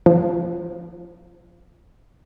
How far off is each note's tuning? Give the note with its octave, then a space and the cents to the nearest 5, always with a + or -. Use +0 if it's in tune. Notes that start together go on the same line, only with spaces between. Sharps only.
F3 -20